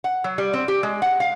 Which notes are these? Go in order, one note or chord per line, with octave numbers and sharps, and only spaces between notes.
F#5
F#3
G3
C4
G4
G#3
F#5
F5